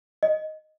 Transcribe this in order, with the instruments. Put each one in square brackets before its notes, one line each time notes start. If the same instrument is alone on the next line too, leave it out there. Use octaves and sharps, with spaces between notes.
[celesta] D#5